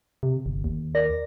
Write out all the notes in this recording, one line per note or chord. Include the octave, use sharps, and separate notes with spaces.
C3
G1
D#2
A#4 D5 A#6